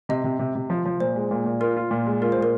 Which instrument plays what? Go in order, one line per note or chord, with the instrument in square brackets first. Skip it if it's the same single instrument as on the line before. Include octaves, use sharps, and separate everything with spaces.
[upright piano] C3 [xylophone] D#5
[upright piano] C3
C3
C3
F3
F3
[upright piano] A#2 [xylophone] C5
[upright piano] G#3
A#2
A#2
[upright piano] F4 [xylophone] A#4
[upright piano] F4
A#2
G#3
[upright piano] F4 [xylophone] A#4
[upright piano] A#2 [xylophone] C5
[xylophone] A#4